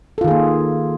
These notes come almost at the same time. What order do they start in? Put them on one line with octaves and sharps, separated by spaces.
A4 F4 D#3 G#4 A#3